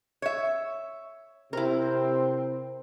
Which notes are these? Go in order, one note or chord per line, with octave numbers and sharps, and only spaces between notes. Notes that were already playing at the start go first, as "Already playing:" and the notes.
C#5 E5
C3 C4 E4 A#4